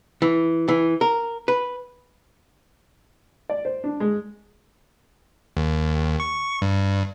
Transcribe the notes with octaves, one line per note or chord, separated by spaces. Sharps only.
E3
E3
A#4
B4
D5
C5
D4
G#3
D#2
C#6
G2